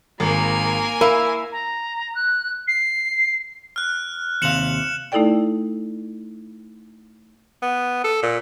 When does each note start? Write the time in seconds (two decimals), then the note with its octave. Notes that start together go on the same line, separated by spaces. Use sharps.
0.20 G#1 A#3 G#5
1.01 E4 A#4 F5 D#7
1.52 A#5
2.15 F#6
2.68 C7
3.76 F6 F#6
4.42 D#2 C3 F5 C#7 E7 F#7
5.12 A3 D#4 E4 A4 D5 G5
7.62 B3
8.04 A4
8.23 A#2